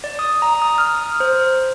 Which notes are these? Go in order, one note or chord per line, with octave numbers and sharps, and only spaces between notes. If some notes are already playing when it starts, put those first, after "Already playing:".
D5
D#6
A#5
D#6
F6
C5